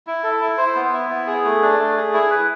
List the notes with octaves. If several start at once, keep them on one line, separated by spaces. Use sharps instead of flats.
E4
A4
E4
C5
B3
E4
B3
G#4
A3
D4
A3
G#4
E4
B4